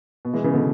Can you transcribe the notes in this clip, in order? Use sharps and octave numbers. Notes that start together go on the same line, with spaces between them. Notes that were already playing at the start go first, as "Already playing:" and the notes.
B2
E3 G#3
C#3 E3
B2 D3